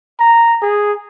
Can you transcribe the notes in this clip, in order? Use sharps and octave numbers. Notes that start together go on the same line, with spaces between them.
A#5
G#4